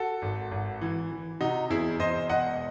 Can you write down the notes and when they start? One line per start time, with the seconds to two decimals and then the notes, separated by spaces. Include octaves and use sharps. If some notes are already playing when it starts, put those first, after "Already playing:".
Already playing: F#4 A4
0.22 G#1
0.51 G#1
0.81 E3
1.11 E3
1.41 C3 D#4 F#4
1.70 E2 E4 G#4
2.00 E2 C5 D#5
2.29 E1 D#5 F#5